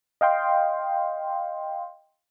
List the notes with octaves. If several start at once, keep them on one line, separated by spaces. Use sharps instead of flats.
D#5 F5 G5 C6